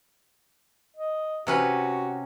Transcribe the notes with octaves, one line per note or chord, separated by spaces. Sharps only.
D#5
C3 C#4 F#4 B4